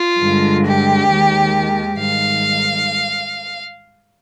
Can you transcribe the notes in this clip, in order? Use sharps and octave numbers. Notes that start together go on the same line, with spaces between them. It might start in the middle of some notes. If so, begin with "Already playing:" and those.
Already playing: F4
G2 D3 G#3
G4
D#2 D#3 G#3
G#2 D#3 G3 F5